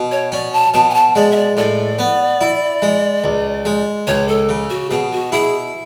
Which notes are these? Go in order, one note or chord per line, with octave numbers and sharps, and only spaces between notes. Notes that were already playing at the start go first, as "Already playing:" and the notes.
Already playing: B2
C#5
C#4 D5
A5
B2 A5
G#5
A5
G#3 D5
E5
D5
A2 D5
B3
E4
G#3
C#2
G#3
C#2 C#5
A4
C#3
F#4
B2 G#4
F#4
E4 G#4